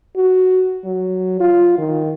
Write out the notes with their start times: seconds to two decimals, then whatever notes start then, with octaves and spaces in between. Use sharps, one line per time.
0.16 F#4
0.84 F#3
1.40 F4
1.78 D#3